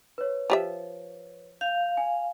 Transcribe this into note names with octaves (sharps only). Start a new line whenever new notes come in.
B4 C#5
F3 G4 E5
F5 G6
G#5